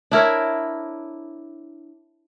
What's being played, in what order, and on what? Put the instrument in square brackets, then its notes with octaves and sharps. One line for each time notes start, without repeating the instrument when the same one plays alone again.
[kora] D4 E4 A#4 C#5